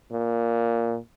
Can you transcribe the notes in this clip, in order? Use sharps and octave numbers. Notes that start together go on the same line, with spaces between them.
A#2